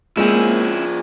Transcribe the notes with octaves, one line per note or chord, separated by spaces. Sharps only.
F3 G#3 A#3 C4 C#4 E4 G#4